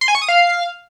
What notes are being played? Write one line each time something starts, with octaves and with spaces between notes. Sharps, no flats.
C6
G#5
C#6
D#6
F5